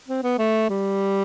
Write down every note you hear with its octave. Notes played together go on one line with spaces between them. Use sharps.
C4
B3
A3
G3